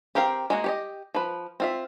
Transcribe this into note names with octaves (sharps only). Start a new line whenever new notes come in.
C4 G4 A#4 F5 G5
G#3 A#3 F#4
G4 C#5 D#5
F3 B4
C4 F4 E5